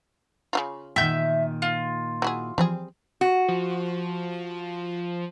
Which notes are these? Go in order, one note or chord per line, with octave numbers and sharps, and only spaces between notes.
C#3 E4 F4
A#2 D#3 E5 F#5 G5 G6
F4
F#3 E4 G#4
E3 F3 G3 C4 G#4
F#4
F3